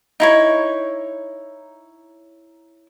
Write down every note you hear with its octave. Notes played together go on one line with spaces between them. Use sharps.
D#4 E4 C#5